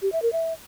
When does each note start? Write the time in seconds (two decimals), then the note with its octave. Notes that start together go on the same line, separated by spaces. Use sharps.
0.02 G4
0.12 E5
0.22 A#4
0.33 E5